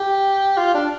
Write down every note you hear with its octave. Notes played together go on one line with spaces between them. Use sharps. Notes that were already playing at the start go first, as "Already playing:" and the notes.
Already playing: G4
F4
D4